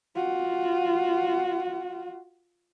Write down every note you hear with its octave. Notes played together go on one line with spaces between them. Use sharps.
F4 F#4